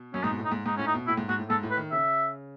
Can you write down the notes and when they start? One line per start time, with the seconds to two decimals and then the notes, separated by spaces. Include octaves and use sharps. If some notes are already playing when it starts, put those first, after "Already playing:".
Already playing: B2
0.14 F#2 C#4
0.23 G#2 D#4
0.30 B2
0.38 A2
0.45 D#4
0.52 G#2
0.66 G#2 D#4
0.77 A2 C#4
0.87 D#4
0.94 B2
1.07 A2 E4
1.17 G#2
1.28 G#2 F#4
1.38 A2
1.50 G#2 A4
1.63 A2
1.71 B4
1.77 D#3
1.92 C#3 E5